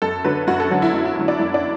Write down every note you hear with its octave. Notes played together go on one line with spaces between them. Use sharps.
F#2 A4
D3 F#3 B4
F#2 F#4
A4
D3 F#3
E4
F#2
E4
D3 F#3 E4
D4
F#2 E4
D4